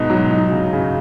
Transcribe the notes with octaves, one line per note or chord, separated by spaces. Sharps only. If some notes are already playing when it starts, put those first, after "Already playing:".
Already playing: G#2 B2 D#4
F#3
D#4
C#3
C#3